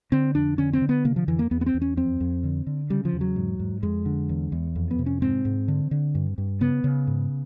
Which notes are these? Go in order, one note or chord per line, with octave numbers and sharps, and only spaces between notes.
D3 C4
F2 D4
D3 C#4
C4
D3
B3
C3 A#3
F3
F2 E3
A#3
E2 B3
B3
C4
E2
C#4
F2 C4
F2
D3
D3
C#3 G3
F3
E2
F#3
G#2
G#2
F2 G#3
D3
E2
E2
F2
B3
C3
C#4
G#2 C4
G#2
D3
D3
G2
G2
C#3 B3
C#3
G#2